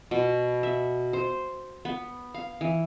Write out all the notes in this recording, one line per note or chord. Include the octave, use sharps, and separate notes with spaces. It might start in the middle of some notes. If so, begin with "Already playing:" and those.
B2
E5
C5
B3
F5
E3